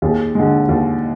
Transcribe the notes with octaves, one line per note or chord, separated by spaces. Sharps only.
D#2 G#4
D3 G#3
D#2